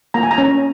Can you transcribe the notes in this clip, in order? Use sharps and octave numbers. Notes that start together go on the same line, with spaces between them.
A#3 A#5
G#5
A#5
C#4